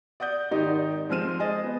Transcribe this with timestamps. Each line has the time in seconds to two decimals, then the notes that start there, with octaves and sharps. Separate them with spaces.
0.20 D5 F#5 D#6 G6
0.51 G#1 D#3 D#4 G4 D5 D#5
1.09 F3 G#3 C4 F6 D#7 E7
1.40 G#4 D#5 A6
1.63 B3